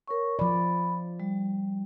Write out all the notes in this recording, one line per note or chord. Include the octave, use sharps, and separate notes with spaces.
A#4 C#5 C#6
F3 D5 B5
G3